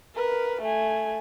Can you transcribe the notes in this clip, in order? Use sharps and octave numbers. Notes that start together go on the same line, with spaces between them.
A#4 B4
A3 G#5